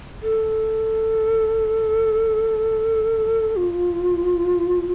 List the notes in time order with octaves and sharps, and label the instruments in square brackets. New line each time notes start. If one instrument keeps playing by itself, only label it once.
[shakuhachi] A4
F4